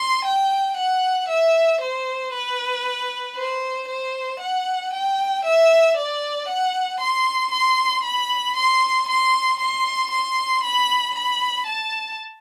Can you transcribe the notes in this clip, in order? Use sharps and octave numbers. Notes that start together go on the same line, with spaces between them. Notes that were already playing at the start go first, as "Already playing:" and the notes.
Already playing: C6
G5
F#5
E5
C5
B4
C5
C5
F#5
G5
E5
D5
F#5
C6
C6
B5
C6
C6
C6
C6
B5
B5
A5